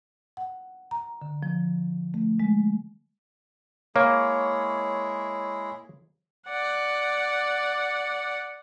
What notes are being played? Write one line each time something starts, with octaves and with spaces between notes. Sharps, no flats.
F#5
A#5
D3
F3
A3
G#3
G#3 A#3 E4 G#4 C#5
D5 F#5